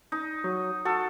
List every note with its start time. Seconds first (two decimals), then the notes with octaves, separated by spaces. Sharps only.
0.12 D#4
0.44 F#3
0.85 F#4 A4